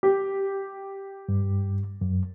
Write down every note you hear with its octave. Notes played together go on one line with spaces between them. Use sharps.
G4
G2
F#2